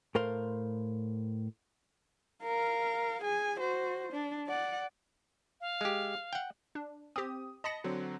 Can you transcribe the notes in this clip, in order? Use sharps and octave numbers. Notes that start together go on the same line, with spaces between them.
A2 A4 A#4 C5 F5 C6
A#4 F5
G#4 G#5
F#4 C5
D4
D5 F#5
F5
G#3 G4
F#5 G5
D4
C4 G4 D#6
D#5 A5 B5 A#6 C#7
D3 F#3 C4